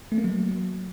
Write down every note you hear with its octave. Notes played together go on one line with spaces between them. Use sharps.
A3
A#3
F#3